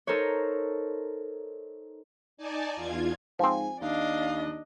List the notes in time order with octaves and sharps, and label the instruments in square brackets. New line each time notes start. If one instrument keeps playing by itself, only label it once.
[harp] D#4 A4 A#4 C5 C#5
[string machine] D#4 D5 G#5 A5
E2 F4 G#6
[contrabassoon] G#2 [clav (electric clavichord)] F3 C4 [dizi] G#5
[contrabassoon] D#2 [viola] D4 D#5 [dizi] F5